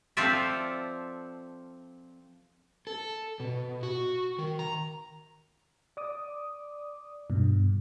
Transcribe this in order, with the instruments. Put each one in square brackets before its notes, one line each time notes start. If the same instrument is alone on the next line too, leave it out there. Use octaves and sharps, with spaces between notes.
[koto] F3 C4 F4 A4 D5 E5
[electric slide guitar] A4
B2
F#4
D#3
A#5
[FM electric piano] D5 D6 D#6
G2 B2